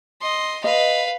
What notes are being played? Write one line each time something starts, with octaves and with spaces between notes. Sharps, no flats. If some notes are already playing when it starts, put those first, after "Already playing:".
D#5 C6
B4 D#5 F5